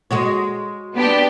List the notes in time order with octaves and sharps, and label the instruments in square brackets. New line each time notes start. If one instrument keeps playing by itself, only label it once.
[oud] G#3 F#4 C#5
[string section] B3 D4 G4